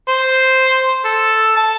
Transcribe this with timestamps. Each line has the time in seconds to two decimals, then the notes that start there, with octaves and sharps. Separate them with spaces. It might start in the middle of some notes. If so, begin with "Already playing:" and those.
0.08 C5
1.05 A4
1.57 A5